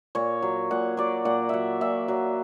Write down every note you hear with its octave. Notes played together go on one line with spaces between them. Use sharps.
A#2 C#5
F#3
A#2 F#5
F#3 D5
A#2 F#5
F#3 E5 F#5
A#2 E5
F#3